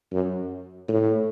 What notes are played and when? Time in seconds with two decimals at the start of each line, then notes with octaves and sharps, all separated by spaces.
0.12 F#2
0.88 A2